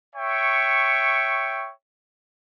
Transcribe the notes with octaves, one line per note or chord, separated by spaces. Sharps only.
C#5 E5 G5 C#6